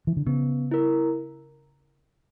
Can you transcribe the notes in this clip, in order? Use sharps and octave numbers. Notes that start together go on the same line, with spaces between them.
E3
D3
C#3 B3
E4 A#4